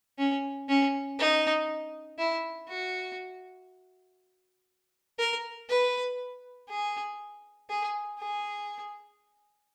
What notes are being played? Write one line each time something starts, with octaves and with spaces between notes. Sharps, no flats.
C#4
C#4
D#4
E4
F#4
A#4
B4
G#4
G#4
G#4